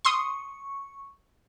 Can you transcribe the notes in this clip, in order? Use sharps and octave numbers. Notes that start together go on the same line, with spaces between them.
C6 C#6 D#6